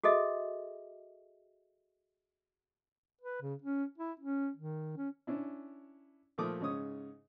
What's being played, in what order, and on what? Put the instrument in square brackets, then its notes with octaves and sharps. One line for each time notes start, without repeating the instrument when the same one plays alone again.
[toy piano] F#4 G#4 A4 D#5 E5
[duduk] B4
C#3
C#4
E4
C#4
D#3
C#4
[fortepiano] C#4 D4 E4
A#2 F3 A3 D6 D#6
G#2 C#3 C#5 D#6